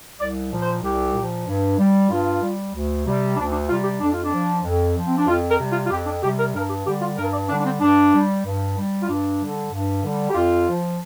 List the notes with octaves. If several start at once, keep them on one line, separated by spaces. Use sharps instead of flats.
C2 D5
A#2 F3
C5
C2 G4
A#2 F3
G2
G3
G2 F4
G3
D2
C3 G3
D2 D4
D4
C3 G3 F4
G4
F2 D4
F4
D4
F3
F2
F3
C4
D4
F2 F4
A#4
C3 G3
F4
F4
F2 G4
D4
C3 G3 G4
A#4
G2 A#4
G4
D3 G3 G4
F4
G2 A#4
D5
D3 G3 D4
D4
C4
G2 D4
G3
G2
G3
F4
G2 D4
D3 G3
G2
D3 G3
G4
F2 F4
F3